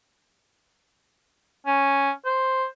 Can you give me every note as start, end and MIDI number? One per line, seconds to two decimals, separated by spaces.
1.66 2.10 61
2.25 2.66 72